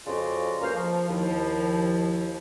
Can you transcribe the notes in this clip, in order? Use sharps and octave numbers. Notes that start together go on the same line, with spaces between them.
F2 C#3 F4 F#4 D5 D#5
C#2 A#3 F#4 C5 A#5 F6
F3
D#2 F3 E4